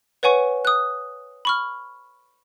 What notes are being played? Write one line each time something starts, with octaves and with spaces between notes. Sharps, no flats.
B4 C#5 F#5 G#5 C#6
D#6 F#6
B5 C#6 F6